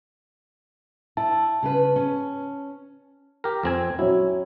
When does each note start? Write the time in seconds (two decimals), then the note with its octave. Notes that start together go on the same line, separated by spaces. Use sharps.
1.17 E4 A5
1.63 C#3 C#4 B4
1.96 C#4
3.44 G4 A#4
3.63 F2 C4 G#5
3.99 F#3 C#4 E4